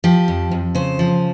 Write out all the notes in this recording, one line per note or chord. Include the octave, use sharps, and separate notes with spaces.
F3 G4
F2
F2
C#3 C5
F3